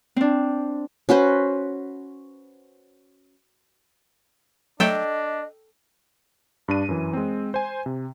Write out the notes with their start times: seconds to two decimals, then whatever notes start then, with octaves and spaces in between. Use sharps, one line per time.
0.16 C4 D4
1.09 C#4 F#4 B4 C5
4.80 F#3 A3 D4 A4 D#5 G5
6.68 G2 D4 D#7
6.89 F#2 E3
7.13 G#3 C4
7.54 C5 G#5
7.86 C3